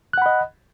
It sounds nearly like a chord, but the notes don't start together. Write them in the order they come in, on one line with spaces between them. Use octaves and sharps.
F#6 F#5 B5 D#5